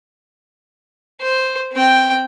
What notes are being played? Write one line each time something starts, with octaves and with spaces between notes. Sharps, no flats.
C5
C4 G5